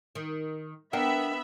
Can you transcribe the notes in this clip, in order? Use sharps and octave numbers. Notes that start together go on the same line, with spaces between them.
D#3
B3 D4 A#4 E5 F#5 G5 B5